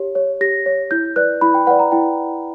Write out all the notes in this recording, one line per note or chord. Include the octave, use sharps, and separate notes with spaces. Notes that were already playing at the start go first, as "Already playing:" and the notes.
Already playing: G4 C#5
C#5
G4 A#6
C#5
E4 G6
B4 D5 F#6
E4 B5
G5
B4 D5 F#5
A#5
E4 G5